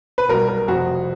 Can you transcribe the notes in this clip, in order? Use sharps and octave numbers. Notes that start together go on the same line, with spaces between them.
B4
B1 B2 G3 A#4
A#4
F1 F2 C3 F3 F#4